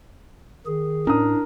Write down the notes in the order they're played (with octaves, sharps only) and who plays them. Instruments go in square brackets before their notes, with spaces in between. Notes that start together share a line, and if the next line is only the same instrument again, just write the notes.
[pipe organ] D#3 G#4
[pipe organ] A2 [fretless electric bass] C#4 [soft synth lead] D4 [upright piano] A#4 D#6